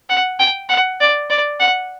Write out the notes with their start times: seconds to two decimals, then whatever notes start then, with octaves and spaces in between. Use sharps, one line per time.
0.09 F#5
0.39 G5
0.69 F#5
1.00 D5
1.30 D5
1.60 F#5